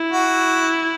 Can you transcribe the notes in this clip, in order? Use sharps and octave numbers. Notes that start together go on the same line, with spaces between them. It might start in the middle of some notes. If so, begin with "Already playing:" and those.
Already playing: E4
F#4